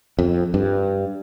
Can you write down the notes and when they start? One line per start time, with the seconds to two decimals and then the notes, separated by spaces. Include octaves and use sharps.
0.19 F2
0.54 G2